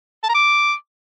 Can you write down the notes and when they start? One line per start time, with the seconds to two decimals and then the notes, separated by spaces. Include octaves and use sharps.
0.23 A5
0.29 A#5
0.34 D6